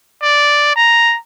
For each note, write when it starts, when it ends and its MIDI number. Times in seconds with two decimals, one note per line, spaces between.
0.22 0.74 74
0.76 1.17 82